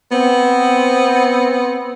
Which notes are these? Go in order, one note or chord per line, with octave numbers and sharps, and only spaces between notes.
B3 C4